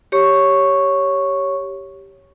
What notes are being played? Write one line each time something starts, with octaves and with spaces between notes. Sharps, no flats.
G4 C#5 C#6